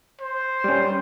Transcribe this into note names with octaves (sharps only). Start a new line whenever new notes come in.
C5
G3 C#4